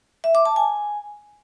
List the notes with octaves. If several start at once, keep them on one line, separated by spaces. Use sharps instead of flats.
E5
D6
A5
G#5